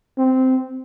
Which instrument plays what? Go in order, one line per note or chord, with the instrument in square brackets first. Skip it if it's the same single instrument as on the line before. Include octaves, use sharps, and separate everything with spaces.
[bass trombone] C4